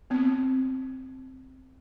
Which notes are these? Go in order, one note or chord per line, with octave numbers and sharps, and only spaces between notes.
B3 C4